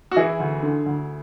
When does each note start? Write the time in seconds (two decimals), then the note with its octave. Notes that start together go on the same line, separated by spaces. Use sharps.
0.11 F#4
0.16 E3 E4 G#4
0.40 D2
0.63 D3
0.86 D2